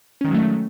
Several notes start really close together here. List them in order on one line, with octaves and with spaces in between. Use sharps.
C#4 D#3 G#3 F#3 A3